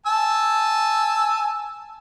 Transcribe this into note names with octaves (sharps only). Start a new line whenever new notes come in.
G#5 A5 E6